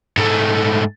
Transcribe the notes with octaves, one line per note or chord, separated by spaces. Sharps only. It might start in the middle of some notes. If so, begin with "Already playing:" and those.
G#2 A3